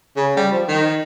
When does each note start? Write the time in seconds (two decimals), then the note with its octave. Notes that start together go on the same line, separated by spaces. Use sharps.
0.17 C#3
0.37 G3
0.52 F3
0.68 D#3